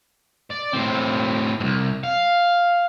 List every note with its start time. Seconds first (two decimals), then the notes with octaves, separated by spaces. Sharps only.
0.51 D5
0.73 A2 C4
1.60 C2 G#2
2.04 F5